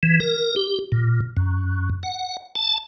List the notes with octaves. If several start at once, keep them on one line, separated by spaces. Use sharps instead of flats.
E3
A#4
G4
A#2
F#2
F#5
A5